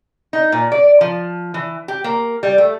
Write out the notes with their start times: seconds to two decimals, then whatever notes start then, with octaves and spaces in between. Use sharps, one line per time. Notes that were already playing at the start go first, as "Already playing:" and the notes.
0.33 D#4
0.52 A#2
0.72 D5
1.01 F3
1.54 E3
1.88 G4
2.04 A#3
2.43 G3
2.58 A3